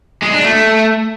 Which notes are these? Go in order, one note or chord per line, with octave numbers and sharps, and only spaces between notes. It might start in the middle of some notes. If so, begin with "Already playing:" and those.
G#3
D4
A3